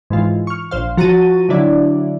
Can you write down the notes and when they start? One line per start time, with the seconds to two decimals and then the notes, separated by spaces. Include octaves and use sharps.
0.10 G#2 E3 F4
0.47 C#6 F6
0.71 A#1 C5 F5
0.97 F3 F#4 A#5 C#6 A6 D#7
1.49 D3 F#3 E4 D5